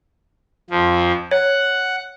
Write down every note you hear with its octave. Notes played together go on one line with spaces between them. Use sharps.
F2 F3
C#5 F#5